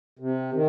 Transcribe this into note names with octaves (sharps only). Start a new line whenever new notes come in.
C3
D#3